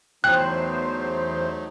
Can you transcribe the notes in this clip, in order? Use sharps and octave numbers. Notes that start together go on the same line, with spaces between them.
E2 F#3 A3 D#4 C5 G5 F#6